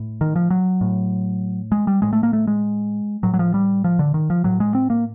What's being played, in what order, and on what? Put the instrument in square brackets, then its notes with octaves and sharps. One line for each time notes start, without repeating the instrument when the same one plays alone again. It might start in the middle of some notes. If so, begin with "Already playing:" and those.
Already playing: [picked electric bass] A2
D#3
F3
F#3
A2
G#3
G3
A2 G#3
A3
A#3
A3
G#3
A2 F#3
F#3
F3
G3
F3
D3
D#3
F3
A2 F#3
G#3
C4
A#3